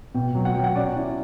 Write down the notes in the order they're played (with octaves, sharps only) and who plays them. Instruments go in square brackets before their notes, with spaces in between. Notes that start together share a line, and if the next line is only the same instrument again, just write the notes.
[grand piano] B2 [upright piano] G5
[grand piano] F#3
[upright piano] F#5
[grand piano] F#3 [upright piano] G5
[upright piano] F#5
[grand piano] C#4 [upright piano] D5
[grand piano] E4